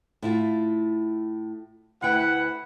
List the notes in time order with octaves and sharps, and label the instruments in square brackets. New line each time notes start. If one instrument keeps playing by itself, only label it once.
[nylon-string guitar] A2 E4 F4
[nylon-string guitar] D2 G5 [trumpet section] E4 B4 F#5